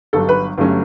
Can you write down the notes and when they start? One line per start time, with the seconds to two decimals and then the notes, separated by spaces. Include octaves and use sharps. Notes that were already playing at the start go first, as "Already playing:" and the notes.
0.13 G1 G2 F#3 A4
0.29 B4
0.58 G1 G2 F#3 A3 C#4